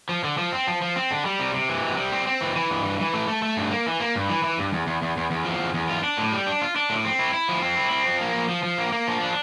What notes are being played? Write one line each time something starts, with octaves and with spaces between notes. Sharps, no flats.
F3
D3
F3
C4
F3
F3
C4
D3
G3
C3
C3
E3
C3
G3
C4
C4
E3
E3
G2
E3
E3
A3
A3
A3
G2
A#3
E3
A#3
G2
E3
E3
G2
E2
E2
E2
E2
E2
F3
E2
E2
F4
D4
A2
G3
D4
F4
D4
A2
C4
E4
E4
F3
C4
E4
C4
F3
A#3
F3
F3
F3
A#3
A#3
F3
D4